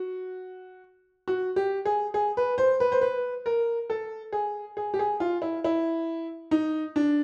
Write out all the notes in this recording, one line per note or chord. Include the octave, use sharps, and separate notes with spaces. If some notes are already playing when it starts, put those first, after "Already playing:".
Already playing: F#4
F#4
G4
G#4
G#4
B4
C5
B4
C5
B4
A#4
A4
G#4
G#4
G4
G#4
F4
E4
E4
D#4
D4